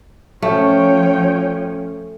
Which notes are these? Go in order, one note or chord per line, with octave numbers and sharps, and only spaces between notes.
F3 A3 C#4 C#5 G5